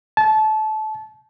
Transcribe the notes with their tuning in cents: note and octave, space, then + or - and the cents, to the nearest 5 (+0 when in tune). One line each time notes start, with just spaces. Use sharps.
A5 -25